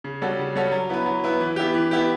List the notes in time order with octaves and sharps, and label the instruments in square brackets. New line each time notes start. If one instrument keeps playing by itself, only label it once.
[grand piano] C#3
G3 C#4 F#4 A4
C#3
G3 C#4 F#4 A4
F#3
B3 E4 B4
F#3
B3 E4 B4
E3
B3 E4 G4
E3
B3 E4 G4